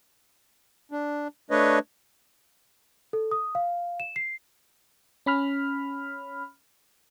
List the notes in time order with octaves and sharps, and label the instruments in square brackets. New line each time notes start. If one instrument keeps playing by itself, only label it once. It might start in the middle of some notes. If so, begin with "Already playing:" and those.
[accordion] D4
A3 D4 B4 C#5 D#5
[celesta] A4
D#6
F5
E7
C7
[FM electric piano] C#4 B5 F6